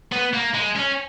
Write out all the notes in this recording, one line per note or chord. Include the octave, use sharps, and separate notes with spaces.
B3
A#3
G#3
C#4